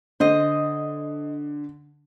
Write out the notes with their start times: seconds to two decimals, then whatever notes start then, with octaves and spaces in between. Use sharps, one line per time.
0.20 D3 C5 D#5